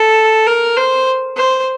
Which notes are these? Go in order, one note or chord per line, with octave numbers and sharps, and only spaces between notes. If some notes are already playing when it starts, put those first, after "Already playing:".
Already playing: A4
A#4
C5
C5